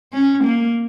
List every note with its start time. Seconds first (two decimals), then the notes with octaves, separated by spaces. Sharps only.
0.13 C#4
0.44 A#3